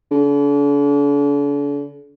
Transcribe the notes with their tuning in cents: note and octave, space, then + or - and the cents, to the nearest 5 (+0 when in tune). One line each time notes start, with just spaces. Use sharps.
D3 -40